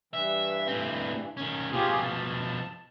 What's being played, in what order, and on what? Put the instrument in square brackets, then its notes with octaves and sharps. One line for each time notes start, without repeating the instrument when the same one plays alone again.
[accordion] G2 E3 [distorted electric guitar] E5
[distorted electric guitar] A2 C4
D#3 C#4
[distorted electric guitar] B2 F3 [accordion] F4 G4 G#4
[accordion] A5